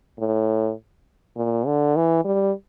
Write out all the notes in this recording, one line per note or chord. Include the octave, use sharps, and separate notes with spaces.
A2
A#2
D3
E3
G3